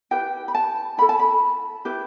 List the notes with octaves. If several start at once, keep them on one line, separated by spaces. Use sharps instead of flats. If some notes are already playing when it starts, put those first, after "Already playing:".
E4 G4 B4 G5
B5
A5
E4 A4 B5
A5
B5
E4 G4 B4